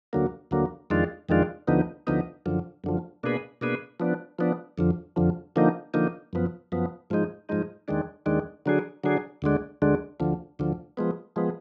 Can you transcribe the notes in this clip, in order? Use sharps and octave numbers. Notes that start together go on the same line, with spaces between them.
D2 D3 F#3 A#3
D2 D3 F#3 A#3
F2 D#3 G#3 D4 F4
F2 D#3 G#3 D4 F4
D2 D3 F3 B3 D#4
D2 D3 F3 B3 D#4
F#2 D3 F3
F#2 D3 F3
B2 A#3 D4 G#4 B4
B2 A#3 D4 G#4 B4
F3 B3 D4
F3 B3 D4
F2 D3 F3
F2 D3 F3
D3 F3 A#3 D#4
D3 F3 A#3 D#4
F#2 F3 B3
F#2 F3 B3
G#2 F3 G#3 D#4
G#2 F3 G#3 D#4
D#2 D#3 G#3 D4
D#2 D#3 G#3 D4
D3 F#3 D4 G#4
D3 F#3 D4 G#4
D2 D3 G#3 D4
D2 D3 G#3 D4
D2 D3 F3
D2 D3 F3
F3 G#3 B3
F3 G#3 B3